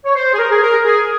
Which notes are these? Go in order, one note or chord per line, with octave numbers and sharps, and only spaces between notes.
C#5
C5
G#4
A#4
G#4
A#4
G#4